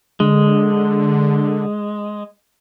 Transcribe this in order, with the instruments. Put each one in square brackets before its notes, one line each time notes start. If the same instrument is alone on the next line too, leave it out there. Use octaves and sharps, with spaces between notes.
[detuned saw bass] D3 [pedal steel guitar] G#3